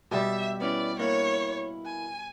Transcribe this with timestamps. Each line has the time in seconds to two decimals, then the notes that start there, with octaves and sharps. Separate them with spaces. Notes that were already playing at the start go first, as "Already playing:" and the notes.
0.11 B2 G3 G4 E5
0.60 B3 C#4 E4 D5
0.99 A#3 D4 E4 C#5
1.85 G#5